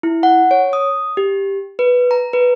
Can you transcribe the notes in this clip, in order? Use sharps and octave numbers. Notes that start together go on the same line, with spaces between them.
E4
F#5
C#5
D#6
G4
B4
A#5
B4